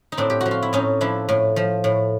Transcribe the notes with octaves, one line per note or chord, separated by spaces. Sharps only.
D#4
A2 C4 D4
G4
F3 F#4
F4
E4
A2 C#4 D#4
F3 D4 E4
A2
F3
A2